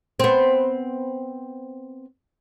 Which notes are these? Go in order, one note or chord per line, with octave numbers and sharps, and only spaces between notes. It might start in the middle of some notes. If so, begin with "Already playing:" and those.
B3 C4